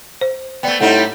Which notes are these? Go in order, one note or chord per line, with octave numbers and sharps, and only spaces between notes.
C5
A3 B3 D5 G5
A2 G3 C4 D#4 F#5